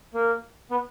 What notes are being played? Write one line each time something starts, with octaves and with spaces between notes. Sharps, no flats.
A#3
B3